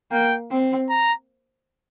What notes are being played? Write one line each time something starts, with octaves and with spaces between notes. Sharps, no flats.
A#3 G5
C4
A#5